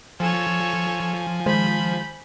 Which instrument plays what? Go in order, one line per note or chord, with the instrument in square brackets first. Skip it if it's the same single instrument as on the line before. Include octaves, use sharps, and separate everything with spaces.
[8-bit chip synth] F3 [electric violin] A4 C#5 [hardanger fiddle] G#5
[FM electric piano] D#3 G#3 C5 [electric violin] B5 G6